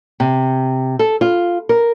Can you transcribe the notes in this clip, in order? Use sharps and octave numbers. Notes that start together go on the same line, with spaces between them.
C3
A4
F4
A#4